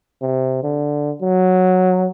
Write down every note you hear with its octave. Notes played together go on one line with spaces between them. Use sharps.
C3
D3
F#3